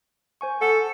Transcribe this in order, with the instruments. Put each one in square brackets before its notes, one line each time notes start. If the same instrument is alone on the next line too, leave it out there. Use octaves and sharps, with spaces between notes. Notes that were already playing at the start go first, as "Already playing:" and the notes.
[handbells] C5 G#5 C#6
[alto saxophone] A4 [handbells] F#5